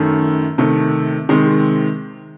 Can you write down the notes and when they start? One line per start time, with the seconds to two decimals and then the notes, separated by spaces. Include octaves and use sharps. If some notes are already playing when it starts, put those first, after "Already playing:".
Already playing: F#2 D#3 A3
0.58 C3 D#3 A3
1.29 C3 D#3 G#3 C4